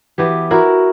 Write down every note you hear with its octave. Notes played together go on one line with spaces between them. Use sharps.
E3 B3 G4
E4 F#4 A#4